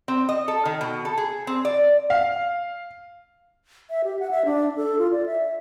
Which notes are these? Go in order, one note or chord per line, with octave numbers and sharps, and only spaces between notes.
C4
D#5
A4
D#3
B2
A4
G#4
C4
D5
F5
E5
G4
F#5
E5
D4
A4
F4
D5
E5